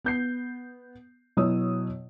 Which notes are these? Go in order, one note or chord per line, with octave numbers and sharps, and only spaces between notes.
B3 G6 C7
B2 F#3 E4 C#5 D#6 E6